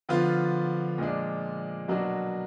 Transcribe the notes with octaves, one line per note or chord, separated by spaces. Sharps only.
D3 F3 B3 F4
A#2 F3 G#3 D4
B2 F#3 A#3 D4 F#4